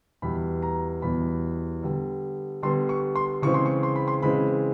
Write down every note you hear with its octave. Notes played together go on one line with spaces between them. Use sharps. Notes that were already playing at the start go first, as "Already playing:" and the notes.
E2 B2 G3 B3 B5
A#5
E2 B2 G3 B3 B5
D3 G3 B3
D3 G3 B3 C6
C#6
C6
C#3 E3 G#3 C4 C#6
C6
C#6
C6
B5
C6
C#3 E3 G#3 C4 B5